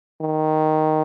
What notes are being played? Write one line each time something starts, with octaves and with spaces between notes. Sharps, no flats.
D#3